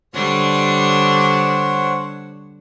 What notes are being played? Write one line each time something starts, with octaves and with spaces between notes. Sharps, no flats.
D3 G3 D4 C5 C#5 F#5